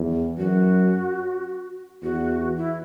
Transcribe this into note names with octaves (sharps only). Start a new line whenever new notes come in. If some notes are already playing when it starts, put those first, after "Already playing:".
Already playing: E2
F#2 F#4
E2 F#4
E4